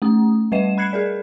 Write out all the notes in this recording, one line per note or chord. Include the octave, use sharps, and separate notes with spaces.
A3 C#4 D#6
G3 B4 D#5 F#5 E7
B5 F#6 G#6 C7 C#7
G#4 A#4 D5